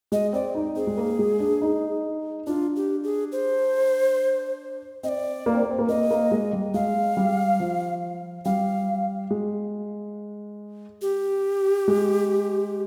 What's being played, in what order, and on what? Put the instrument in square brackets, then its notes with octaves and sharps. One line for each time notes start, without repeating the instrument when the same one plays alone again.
[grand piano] G#3 [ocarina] D#5
[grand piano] C4 [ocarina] D5
[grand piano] D#4
[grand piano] C4 [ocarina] G#4
[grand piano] G#3
A#3
G#3
D4
D#4
[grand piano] D4 [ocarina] F4
[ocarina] G4
G#4
C5
[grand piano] C4 [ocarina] D#5
[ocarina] D5
[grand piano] A#3
C4
A#3
C4
A#3
[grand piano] A#3 [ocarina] D#5
[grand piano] A#3
G#3
G3
[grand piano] G#3 [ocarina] F5
[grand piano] G3
F3
[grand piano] G3 [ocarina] F5
[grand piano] G#3
[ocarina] G4
[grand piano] G#3